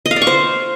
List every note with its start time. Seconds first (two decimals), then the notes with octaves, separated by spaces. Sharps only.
0.06 D#5
0.11 F5
0.16 D5
0.22 C#6
0.27 C5